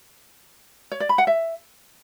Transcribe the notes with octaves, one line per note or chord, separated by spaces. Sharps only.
C#5
D5
B5
F#5
E5